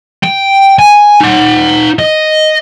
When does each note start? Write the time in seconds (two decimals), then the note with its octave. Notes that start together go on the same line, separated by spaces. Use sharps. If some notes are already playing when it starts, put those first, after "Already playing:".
0.24 G5
0.79 G#5
1.20 D#4 F#5
1.99 D#5